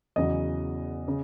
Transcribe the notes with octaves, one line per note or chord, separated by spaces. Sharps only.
E2 C#3 F#3 D#5
C#3